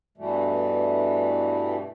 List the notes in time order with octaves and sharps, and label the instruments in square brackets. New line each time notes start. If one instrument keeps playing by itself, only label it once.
[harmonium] G2 B2 E3 G3 A3